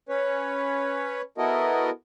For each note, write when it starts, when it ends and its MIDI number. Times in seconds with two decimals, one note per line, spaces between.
0.09 1.22 61
0.09 1.22 71
0.09 1.22 73
1.38 1.90 59
1.38 1.90 64
1.38 1.90 66
1.38 1.90 69
1.38 1.90 70
1.38 1.90 75